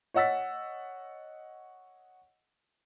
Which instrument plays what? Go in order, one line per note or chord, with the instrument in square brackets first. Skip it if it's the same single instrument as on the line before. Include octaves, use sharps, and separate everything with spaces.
[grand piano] C#5 D#5 F#5 E6 A6 B6